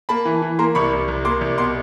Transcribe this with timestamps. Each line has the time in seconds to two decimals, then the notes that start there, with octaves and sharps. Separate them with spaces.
0.09 A#3 A5 B5
0.25 E3
0.42 E3
0.59 A#3 A#5 C6
0.75 C2 B5 C#6
0.92 C2
1.08 C2
1.25 A#3 C6 D6
1.41 C2
1.58 B2 C6 D6